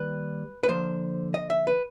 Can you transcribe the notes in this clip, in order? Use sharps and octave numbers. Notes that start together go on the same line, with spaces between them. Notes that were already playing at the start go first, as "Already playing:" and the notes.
Already playing: D#3 G3 A#3 B4
B4
D3 F3 A#3 C5
D#5
E5
B4